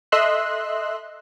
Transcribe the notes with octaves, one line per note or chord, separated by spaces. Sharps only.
A4 D#5 E5 C6 E6 F#6